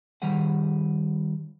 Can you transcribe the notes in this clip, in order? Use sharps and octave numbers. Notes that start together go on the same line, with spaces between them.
D#3 G3 G4 G#4 F#5